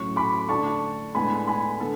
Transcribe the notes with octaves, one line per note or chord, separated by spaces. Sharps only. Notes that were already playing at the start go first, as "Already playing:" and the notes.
Already playing: A2 F#3 C#4 C#6
B5 D6
D3 A3 D4 A5 C#6
A2 G#3 B3 D4 G#5 B5
G#5 B5
D3 B3 A4